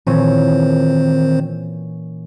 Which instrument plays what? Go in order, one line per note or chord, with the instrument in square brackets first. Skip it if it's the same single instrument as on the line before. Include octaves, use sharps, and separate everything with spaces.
[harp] A#2 E3 C#4 [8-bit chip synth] D#3 C4 C5